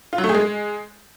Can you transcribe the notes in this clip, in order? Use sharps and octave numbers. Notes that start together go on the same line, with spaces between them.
F4
F#3
A3
G#4
G#3